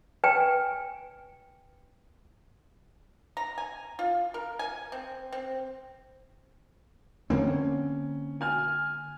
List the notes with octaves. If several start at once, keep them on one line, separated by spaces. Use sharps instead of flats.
B4 G5 G#5
A#5
G#5
F4
A#4
G#5
C4
C4
D3 A#3 C4 C#4
G#5 F6